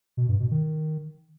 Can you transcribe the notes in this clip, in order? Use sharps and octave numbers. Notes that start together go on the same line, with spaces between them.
B2
G2
B2
D#3